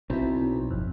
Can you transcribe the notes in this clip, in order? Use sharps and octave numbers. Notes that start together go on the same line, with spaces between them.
B1 C4 E4
G1 F2